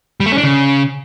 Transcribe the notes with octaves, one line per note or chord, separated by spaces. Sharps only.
G3
A3
C#4
D4
C#3